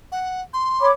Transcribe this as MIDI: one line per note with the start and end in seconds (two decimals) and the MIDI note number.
0.12 0.42 78
0.54 0.87 84
0.80 0.91 73
0.80 0.91 83
0.80 0.91 86